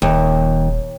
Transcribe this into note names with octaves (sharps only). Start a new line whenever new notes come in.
D#1 D#2